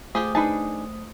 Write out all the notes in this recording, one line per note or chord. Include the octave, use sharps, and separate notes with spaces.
A3 F4 G4 G#4 C5 D#6
D4 D#4 G#4 B4 A5